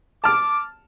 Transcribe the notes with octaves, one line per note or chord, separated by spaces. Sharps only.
A5 D6 F6